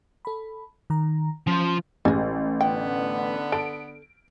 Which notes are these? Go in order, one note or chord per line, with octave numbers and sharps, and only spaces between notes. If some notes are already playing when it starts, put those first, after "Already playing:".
A4 B5
D#3 A#5
F3 C#4 C5 F6
A1 G3 G#3
D3 B3 G5
A4 D7